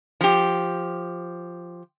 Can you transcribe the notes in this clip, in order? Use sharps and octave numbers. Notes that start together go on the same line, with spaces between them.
F3 G4